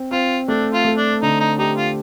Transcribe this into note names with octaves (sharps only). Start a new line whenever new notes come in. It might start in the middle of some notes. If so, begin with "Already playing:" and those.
Already playing: C4
C4 F4
A3 D4
F4
A3
D4
D3 D#4
D#4
D#4 G4
F4